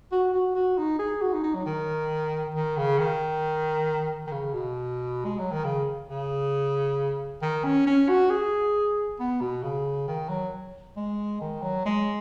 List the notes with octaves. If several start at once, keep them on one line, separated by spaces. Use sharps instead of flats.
F#4
F#4
F#4
D#4
G#4
F#4
D#4
D#4
F#3
D#3
D#3
C#3
D#3
D#3
C#3
B2
G#3
F#3
D#3
C#3
C#3
D#3
C#4
C#4
F#4
G#4
B3
B2
C#3
D#3
F#3
G#3
D#3
F#3
G#3